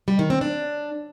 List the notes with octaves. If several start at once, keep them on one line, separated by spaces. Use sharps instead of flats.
G3
D#3
C4
D4